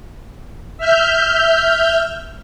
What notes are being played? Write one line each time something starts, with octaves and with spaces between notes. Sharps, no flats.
E5 F6 G6